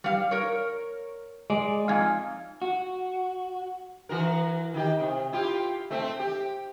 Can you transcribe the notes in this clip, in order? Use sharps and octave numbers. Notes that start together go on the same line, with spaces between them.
G3 F5
A#4 C#5
G#3 D5
F2 D#4 F5 G#5
F#4
E3 F#4 A#4
D#3 G4
C3
E4 F4 G4
A3 C4 E5
G4